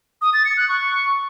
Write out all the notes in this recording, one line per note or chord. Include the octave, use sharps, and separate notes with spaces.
D#6
A6
C#7
F#6
C#6